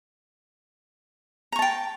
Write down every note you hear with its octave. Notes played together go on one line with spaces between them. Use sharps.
G5 A5 A#5 C#6